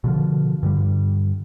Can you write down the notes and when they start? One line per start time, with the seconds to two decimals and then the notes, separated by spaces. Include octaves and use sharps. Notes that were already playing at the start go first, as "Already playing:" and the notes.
0.04 B2 D3 F3
0.63 G2 D3 G3